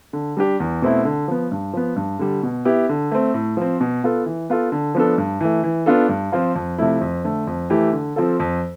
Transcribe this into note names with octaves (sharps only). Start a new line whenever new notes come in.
D3
G3 D4 G4
E2
B2 A3 C4 E4
D3
F3 B3
G2
F3 B3
G2
D3 G3
B2
B3 E4 G4
D3
A3 C4
A2
F3 C4
B2
B3 F4 A4
E3
B3 F4 A4
D3
F3 B3 D4 A4
G2
E3 A3
E3
B3 D4 F4 A4
G2
F3 C4 F4
F2
C3 F3 A3 E4
F2
D3 A3
F2
E3 A3 E4 G4
D3
F3 C4 F4 A4
F2